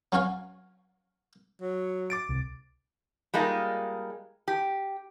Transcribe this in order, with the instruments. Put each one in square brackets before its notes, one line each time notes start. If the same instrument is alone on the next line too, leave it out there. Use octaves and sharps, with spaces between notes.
[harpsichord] F#3 C#4 F#4 C#5 F5
[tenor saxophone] F#3
[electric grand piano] D6 A6 D7
[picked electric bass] C2
[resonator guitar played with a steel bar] G3 G#3 A#3 D#4 F4
G4